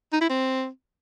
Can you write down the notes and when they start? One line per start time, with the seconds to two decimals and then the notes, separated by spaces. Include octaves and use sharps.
0.13 D#4
0.21 E4
0.29 C4